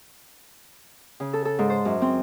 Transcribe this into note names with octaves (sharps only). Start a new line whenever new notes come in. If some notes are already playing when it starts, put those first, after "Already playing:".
C#3
A4
A4
G#2
C5
F#2
C4